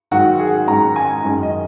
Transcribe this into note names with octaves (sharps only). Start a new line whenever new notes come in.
G#2 D#3 F#3 F#4
G#4
G#2 D#3 G#3 C#4 A#5
G#5
F#2 D#3 G#3 C#4
D#5